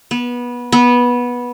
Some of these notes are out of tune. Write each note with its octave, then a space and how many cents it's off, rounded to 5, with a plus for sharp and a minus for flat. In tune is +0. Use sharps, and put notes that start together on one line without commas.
B3 -20
B3 -15